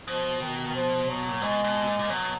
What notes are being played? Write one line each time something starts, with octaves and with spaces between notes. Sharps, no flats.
B2 F3
D#3
D#3
F3
F#3
A#2
B2 G#3
B2
A#2
A#2
B2 F#3